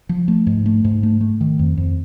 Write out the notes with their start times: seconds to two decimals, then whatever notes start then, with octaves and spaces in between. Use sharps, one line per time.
0.09 F3
0.28 A3
0.47 G#2
0.66 A3
0.85 G#2
1.03 A3
1.21 A3
1.41 D#3
1.59 F2
1.77 F2